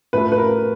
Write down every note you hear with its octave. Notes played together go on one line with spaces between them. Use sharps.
A2 F3 A3 B4
B4
A#4